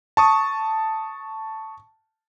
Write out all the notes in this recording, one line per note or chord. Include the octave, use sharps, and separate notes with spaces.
A5 C#6 D#6